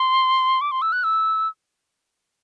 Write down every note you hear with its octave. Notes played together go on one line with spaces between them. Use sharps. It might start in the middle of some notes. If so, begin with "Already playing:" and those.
Already playing: C6
D6
C6
E6
F#6
E6